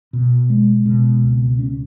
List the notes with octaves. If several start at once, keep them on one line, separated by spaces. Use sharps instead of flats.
B2
G#3
B2
C#2
C#4